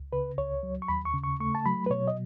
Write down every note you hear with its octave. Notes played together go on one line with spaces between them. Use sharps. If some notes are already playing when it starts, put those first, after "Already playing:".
Already playing: C#2
C#3 B4
C#2 C#5
F#3
C#6
D#2 B5
C#6
C#3
C#6
A3 C#6
A5
F#3 B5
B4
B2 C#5
D#5